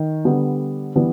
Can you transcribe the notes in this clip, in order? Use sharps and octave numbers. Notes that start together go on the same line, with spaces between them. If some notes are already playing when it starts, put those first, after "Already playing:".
Already playing: D#3
D3 G3 B3 D4
E3 G3 B3 D4